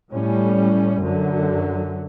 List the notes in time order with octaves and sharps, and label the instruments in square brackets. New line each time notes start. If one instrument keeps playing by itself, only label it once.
[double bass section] A2 G3 C#4
F#2 D3 F#3